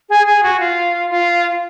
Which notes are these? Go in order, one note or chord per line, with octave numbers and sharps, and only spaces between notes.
G#4
G#4
F#4
F4
F4